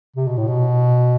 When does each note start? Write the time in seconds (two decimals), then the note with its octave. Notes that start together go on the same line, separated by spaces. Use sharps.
0.16 C3
0.27 B2
0.37 A2
0.47 B2